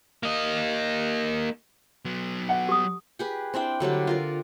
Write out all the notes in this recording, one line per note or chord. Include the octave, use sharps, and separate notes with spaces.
A#3 D#5
F#3 B3
F#5
G4 D#6
G4 G#4 B4
C4 D4 E4 G5
D3 F#3 G3 G4
F4 A#4 D5